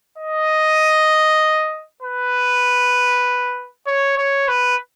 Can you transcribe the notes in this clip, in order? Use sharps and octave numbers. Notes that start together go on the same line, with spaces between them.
D#5
B4
C#5
C#5
B4